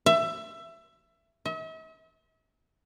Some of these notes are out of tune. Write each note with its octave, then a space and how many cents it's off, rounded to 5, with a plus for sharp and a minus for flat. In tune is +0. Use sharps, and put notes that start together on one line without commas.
E5 +20
E5 -45